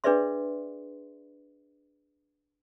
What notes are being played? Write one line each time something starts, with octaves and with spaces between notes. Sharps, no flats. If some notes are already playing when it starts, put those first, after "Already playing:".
D4 G#4 B4 D5 E5 C6